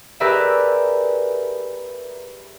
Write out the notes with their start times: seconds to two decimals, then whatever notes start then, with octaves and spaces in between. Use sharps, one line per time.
0.20 G4 G#4 A#4 B4 D5 E5